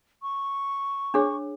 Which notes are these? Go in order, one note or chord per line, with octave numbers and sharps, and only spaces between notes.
C#6
D4 G#4 C#5